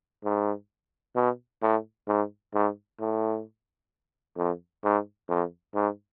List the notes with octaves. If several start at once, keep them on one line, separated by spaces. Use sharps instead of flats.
G#2
B2
A2
G#2
G#2
A2
F2
G#2
F2
G#2